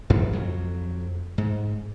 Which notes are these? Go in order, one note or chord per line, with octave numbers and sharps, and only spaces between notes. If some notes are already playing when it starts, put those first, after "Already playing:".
A1 G2 F3
F2 F#3
G#2